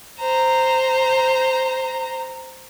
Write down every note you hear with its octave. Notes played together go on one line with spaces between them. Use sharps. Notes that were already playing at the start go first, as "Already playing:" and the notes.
C5 A#5